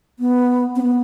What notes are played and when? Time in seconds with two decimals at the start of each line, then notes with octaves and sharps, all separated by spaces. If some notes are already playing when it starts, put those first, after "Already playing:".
0.19 B3
0.76 C4
0.82 B3